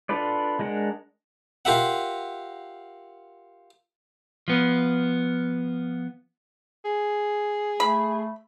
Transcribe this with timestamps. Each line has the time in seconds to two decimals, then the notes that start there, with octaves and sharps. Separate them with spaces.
0.09 D4 F4 A4 B4 D5
0.59 G#3 D4 A#4 F#5
1.65 F4 G4 A#4 E5 F#5
4.48 F3 B3
6.85 G#4
7.80 A3 B5